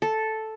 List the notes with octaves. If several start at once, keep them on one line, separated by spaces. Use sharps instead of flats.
A4